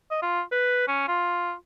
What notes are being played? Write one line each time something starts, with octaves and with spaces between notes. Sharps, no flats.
D#5
F4
B4
C#4
F4